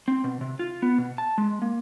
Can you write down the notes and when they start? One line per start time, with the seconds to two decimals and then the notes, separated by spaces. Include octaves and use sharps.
0.08 C4
0.24 B2
0.41 C3
0.59 F4
0.82 B3
0.98 B2
1.18 A5
1.38 G#3
1.62 A#3